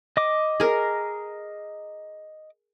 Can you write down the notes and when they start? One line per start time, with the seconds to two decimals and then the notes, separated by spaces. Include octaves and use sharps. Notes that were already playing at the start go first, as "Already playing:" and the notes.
0.17 D#5 D6
0.60 G#4 A#4